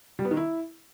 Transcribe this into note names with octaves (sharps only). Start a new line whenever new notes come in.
G3
B3
D#3
E4